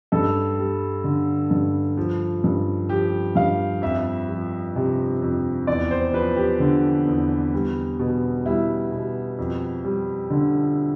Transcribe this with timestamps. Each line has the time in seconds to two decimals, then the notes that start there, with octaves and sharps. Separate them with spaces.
0.12 G2 A4
0.59 G3
1.04 D3
1.51 G2
1.97 F3
2.44 G2
2.89 F3 G4
3.35 G2 F5
3.82 F2 E5
4.29 F3
4.76 C3
5.22 F2
5.67 E2 D5
5.91 C5
6.13 F3 B4
6.36 G4
6.60 D3
7.07 E2
7.53 G3
7.99 B2
8.46 G3 E4
8.92 B2
9.39 F2
9.84 G3
10.30 D3